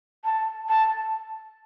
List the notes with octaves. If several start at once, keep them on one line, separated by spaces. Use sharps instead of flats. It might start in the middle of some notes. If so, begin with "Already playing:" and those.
A5
A5